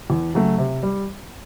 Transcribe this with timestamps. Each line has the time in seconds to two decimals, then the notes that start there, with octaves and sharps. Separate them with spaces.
0.10 E2
0.34 C#3 F#3 A3
0.58 C3
0.83 G3